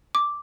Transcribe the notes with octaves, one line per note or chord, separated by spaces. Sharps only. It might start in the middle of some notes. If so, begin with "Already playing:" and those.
D6